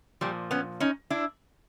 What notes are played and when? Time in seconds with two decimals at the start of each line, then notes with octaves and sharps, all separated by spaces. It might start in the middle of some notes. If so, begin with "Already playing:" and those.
0.21 A#2 F3 G3
0.51 B3 C#4
0.80 C#4 D#4
1.10 D4 E4